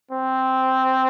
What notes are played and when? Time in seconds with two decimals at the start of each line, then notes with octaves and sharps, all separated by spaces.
0.11 C4